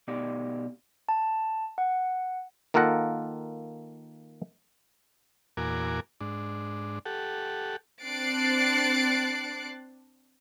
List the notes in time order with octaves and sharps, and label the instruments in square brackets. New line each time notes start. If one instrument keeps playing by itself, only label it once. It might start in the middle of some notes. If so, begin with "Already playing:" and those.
[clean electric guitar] B2 D#4 G4 D5
[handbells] A5
F#5
[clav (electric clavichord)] D#3 A#3 F4 A4 F#5 A#5
[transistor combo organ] E2 A#2 F#4 A#4 G#5 D6
G#2 D4
G4 A4 F#5
[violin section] C4 D4 F#6 A6 C7 D7